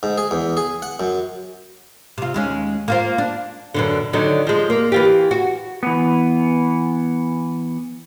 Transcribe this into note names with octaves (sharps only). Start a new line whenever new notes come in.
G#2
G#4
E2
G#4
F#5
F#2
C3 F4
D#2 G#3 C#4
A#3 F4 C5
D4
F#2 B2 D3
D3 D#3 F#3
F3 G#3
A#3
E3 F4 G4
F#4
E3 B3